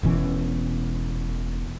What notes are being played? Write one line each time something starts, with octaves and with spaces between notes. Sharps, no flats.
E1 B2 E3 C#4